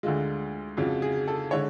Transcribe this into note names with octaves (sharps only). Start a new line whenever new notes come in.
D2 D3 G#3 F4
F2 C#3 F3 F#4
G#4
A4
D3 G#3 C#5